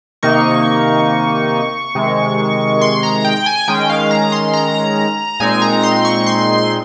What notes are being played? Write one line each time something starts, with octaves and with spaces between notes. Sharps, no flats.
C3 D#3 A#3 D#4 C#6
C3 D#3 G#3
C6
A#5
G5
G#5
D#3 G#3 C#4 G5
F5
A#5
C6
A#5
A#2 G#3 C4 D#4 G#5
A#5
C6
C#6
C6